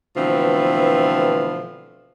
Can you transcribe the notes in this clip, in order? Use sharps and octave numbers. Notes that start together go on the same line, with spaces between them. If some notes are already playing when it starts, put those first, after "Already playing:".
B2 D3 E3 F3 A3 C4